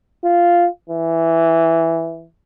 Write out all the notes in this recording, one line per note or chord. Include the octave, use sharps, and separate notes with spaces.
F4
E3